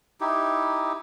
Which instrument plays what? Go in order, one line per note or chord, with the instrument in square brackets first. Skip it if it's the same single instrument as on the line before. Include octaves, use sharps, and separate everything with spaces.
[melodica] D#4 E4 G4